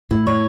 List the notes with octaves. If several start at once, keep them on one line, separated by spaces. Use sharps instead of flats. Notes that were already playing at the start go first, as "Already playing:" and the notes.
A2 E4
C#5